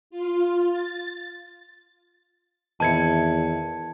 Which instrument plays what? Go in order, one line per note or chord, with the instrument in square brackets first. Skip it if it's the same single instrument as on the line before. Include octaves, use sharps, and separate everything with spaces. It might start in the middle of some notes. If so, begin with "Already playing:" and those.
[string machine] F4
A6
[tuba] E2 [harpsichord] D#3 C4 E4 [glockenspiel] A5 G#6 C#7